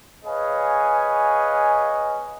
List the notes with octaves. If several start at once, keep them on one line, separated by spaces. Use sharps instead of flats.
G#4 B4 C#5 D#5 F5 G#5